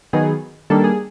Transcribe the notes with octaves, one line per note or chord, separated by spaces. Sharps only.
D#3 F#3 B3 D#4 G#4
D#3 G3 A#3 D4 A4
G#4